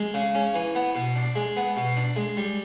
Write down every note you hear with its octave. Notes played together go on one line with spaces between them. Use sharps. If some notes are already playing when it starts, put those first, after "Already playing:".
Already playing: G#3
C#3
C#4
E3
B3
B2
D4
G#3
B3
B2
D4
G#3
G3